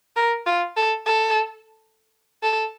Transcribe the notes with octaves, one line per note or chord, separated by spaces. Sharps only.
A#4
F4
A4
A4
A4